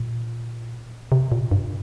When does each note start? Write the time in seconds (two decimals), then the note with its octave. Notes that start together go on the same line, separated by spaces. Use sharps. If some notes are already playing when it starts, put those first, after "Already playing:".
Already playing: A#2
1.12 C3
1.32 A#2
1.51 G2